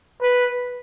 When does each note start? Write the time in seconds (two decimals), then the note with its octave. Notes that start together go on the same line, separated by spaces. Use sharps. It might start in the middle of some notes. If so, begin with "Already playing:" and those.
0.22 B4